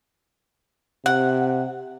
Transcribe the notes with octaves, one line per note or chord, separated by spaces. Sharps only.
C3 F#5